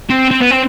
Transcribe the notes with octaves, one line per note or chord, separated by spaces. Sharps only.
C4
C4
B3
C4